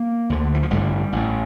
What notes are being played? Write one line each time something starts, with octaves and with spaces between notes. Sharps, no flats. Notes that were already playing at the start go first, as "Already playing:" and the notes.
Already playing: A#3
D2 D3
E3
F3
A1 G2 D3 G3
A1 A2